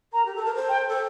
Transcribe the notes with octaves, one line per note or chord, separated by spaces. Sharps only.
A#4 A#5
G4
A4
A5
A#4
C5
G5
A4